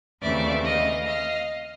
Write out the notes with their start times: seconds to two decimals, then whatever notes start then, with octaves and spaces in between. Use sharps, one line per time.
0.21 D#2 C#3 E3 A3 C4 D5 E5
0.63 D#5 F5
1.06 D#5 F5